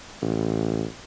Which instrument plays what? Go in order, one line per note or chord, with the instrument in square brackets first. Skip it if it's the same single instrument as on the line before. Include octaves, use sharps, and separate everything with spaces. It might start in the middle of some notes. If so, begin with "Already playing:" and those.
[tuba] A1